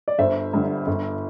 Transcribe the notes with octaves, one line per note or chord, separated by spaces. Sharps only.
D5
G1 C5 E5
G2 D3
G1